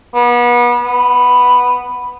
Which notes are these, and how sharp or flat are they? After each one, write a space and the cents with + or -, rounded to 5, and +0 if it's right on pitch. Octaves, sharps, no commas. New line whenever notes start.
B3 -35
B3 +0